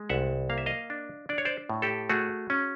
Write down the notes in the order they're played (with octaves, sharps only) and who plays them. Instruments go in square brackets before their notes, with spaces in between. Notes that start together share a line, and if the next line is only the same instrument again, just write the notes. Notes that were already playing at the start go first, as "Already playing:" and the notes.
Already playing: [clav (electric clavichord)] G#3
C2 E5 F#5
A#3 F5
E5
D#5 F5
D4
D4 D5
C#5
C5 D5
A2
G4 A4
A3 F#4 G#4
C#4